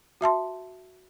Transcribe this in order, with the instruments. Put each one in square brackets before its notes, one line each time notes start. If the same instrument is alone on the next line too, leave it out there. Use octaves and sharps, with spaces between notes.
[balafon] F#4 E5 A5 C6